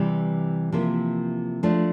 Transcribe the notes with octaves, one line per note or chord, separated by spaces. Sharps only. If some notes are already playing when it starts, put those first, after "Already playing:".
Already playing: C3 E3 G3
C3 F3 A#3 E4
F3 A3 D4